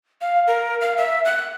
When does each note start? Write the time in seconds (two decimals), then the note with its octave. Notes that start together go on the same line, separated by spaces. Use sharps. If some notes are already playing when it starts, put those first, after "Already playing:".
0.21 F5
0.47 A#4
0.81 F5
0.97 E5
1.25 F#6